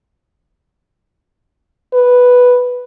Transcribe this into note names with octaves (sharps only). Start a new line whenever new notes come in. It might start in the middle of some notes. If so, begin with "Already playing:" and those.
B4